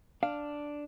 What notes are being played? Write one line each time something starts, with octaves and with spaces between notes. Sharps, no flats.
D4 F5